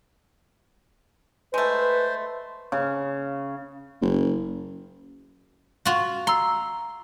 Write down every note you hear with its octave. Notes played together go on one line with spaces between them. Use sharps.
G#3 A3 B4 C5
C#3
F#1
F4 F#4
A#5 C6 E6